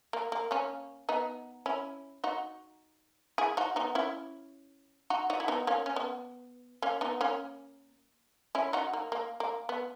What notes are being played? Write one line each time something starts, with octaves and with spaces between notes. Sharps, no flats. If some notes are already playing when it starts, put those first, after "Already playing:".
A#3
A#3
A#3 C#4
B3 D#4
C#4 E4
D#4 F#4
E4 G#4
D#4 F#4
B3 D#4
C#4 E4
D#4 F#4
D#4 F#4
E4
B3 D#4
A#3 C#4
C#4
B3
A#3 C#4
B3 D#4
A#3 C#4
C#4 E4
D#4 F#4
A#3
A#3
A#3
B3